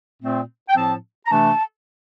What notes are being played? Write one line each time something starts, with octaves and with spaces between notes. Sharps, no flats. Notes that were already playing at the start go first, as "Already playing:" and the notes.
A#2 A3 C4
G5
A2 F3 C4 A5
A#5
C3 E3 A3 D4 A5